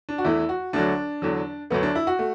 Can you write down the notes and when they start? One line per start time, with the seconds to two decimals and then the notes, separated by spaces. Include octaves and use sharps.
0.09 D4
0.18 F#4
0.25 E2 E3 A3 E4
0.49 F#4
0.73 D2 D3 F#3 D4
1.22 E2 D3 F#3
1.70 D2 D3 F#3 A3 B3
1.83 D4
1.95 E4
2.07 F#4
2.19 A3